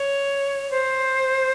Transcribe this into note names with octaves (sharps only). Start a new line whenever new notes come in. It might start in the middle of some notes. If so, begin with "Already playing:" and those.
Already playing: C#5
C5